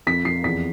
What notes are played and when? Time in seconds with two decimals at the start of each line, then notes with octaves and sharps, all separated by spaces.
0.07 F2 B6
0.25 F2 C7
0.44 E2 B6